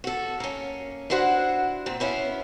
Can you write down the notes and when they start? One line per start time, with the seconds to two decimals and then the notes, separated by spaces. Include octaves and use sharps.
0.04 F#4 A4
0.40 A#3 C#4
1.10 D4 E4 F#4 C5 F#5
1.86 A#2 C4
2.00 B3 C#4 E4 F5